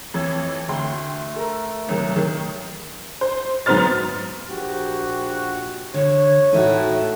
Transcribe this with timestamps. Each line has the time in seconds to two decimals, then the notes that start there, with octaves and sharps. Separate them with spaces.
0.14 F2 E3 C#5 E6
0.68 D2 A3 G5 C6
1.36 A4 A#4
1.89 C2 D#3 F#3
2.16 D#3
3.21 C5
3.66 G#2 F#3 B3 C5 F6 A6
4.49 A#1 F#4 G4
5.94 D3 C#5
6.53 A2 D#4 E4 F#4